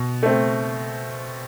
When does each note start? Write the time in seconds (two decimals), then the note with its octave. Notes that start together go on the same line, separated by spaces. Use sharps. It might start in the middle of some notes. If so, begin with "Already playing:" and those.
Already playing: B2
0.23 A3 C4